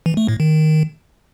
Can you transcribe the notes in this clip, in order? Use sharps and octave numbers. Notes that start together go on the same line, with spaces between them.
E3
A3
A2
D#3